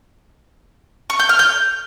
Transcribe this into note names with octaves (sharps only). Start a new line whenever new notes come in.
C#6
G6
F6
G6